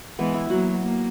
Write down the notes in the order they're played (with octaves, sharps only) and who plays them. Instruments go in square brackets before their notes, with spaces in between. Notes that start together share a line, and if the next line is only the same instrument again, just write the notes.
[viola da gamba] E3 G#3 [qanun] B3
[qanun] E4
[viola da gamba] F#3 A#3 [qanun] F#4
[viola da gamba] A#3